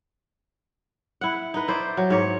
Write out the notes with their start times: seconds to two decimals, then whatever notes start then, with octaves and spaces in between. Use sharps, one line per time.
1.21 E4 F#5
1.54 D#4 B4
1.68 E4 C5 D5
1.97 F#3
2.10 G#2 C#5